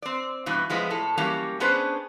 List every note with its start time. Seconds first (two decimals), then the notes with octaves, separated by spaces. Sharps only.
0.02 C4 D5
0.46 G2 B2 E3
0.70 F3 G#3 B3 E4
0.90 A2 A4
1.18 E3 F#3 G3 A#3 C#4
1.60 B3 C#4 D4 G#4 B4 C5